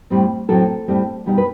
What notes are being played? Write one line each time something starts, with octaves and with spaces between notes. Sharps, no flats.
A2 G3 C4
A2 F#3 A3 C4 A4
A2 G3 C4
B2 G3 B3 D#4
B4